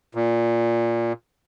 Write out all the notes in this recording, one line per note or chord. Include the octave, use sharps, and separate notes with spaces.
A#2